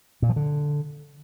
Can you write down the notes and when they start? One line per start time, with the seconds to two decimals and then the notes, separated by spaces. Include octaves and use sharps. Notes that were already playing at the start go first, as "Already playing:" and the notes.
0.22 A#2
0.29 F3
0.36 D3